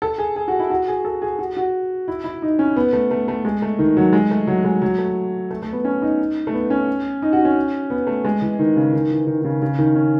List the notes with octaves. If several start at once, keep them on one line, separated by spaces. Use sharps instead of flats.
A4
G#4
G#4
F#4
E4
F#4
G#4
A4
G#4
F#4
F#4
E4
E4
D#4
C#4
B3
A3
A3
A3
G#3
A3
D#3
F#3
G#3
A3
F#3
G#3
F#3
A3
A3
A3
B3
C#4
D#4
A3
B3
C#4
D#4
F#4
C#4
B3
A3
G#3
E3
D#3
C#3
D#3
E3
D#3
D#3
C#3
C#3
D#3
C#4